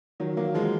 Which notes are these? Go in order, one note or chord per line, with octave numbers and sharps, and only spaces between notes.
D#3 F#3
F#3 A#3
F3 G#3